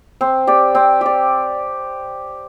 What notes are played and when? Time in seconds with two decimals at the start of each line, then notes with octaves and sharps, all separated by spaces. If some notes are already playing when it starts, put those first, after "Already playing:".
0.21 C4
0.47 G4 D5
0.75 C4
1.01 G4 D5